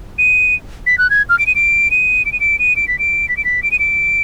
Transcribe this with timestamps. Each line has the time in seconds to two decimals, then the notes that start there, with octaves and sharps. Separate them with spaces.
0.18 D#7
0.86 B6
0.98 F#6
1.10 G#6
1.29 F6
1.39 D7
1.46 D#7
1.55 D7
1.91 D#7
2.25 D7
2.32 D#7
2.40 D7
2.59 D#7
2.76 D7
2.88 B6
2.99 D7
3.29 B6
3.37 D7
3.44 B6
3.63 D7
3.71 D#7
3.79 D7